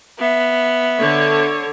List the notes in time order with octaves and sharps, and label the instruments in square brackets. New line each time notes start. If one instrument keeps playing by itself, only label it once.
[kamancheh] B3 E5
[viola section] D3 C#5